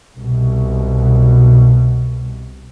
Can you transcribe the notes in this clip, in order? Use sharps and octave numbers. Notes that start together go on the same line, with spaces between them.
C2 B2